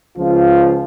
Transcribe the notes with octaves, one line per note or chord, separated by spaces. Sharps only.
C#2 F3 F4